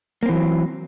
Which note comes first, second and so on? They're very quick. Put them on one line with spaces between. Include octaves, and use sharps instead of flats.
A#3 C4 E3 F#3